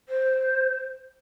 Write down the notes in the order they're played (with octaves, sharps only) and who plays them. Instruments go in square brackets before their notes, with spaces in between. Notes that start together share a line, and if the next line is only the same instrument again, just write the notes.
[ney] C5